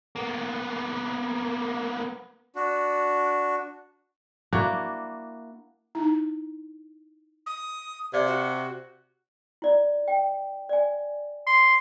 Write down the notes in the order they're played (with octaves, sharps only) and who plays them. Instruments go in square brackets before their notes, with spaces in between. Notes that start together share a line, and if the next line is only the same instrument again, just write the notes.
[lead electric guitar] A#3 B3
[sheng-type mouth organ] D4 F#4
[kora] A#3 D4 E4 F#4
[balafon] D#4 E4
[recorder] D#6
[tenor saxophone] C3 [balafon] D5 F5
[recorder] F#4
[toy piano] E4 D5
G5
D5 G#5
[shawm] C6